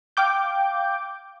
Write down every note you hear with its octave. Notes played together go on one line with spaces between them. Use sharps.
F5 G5 D6 G6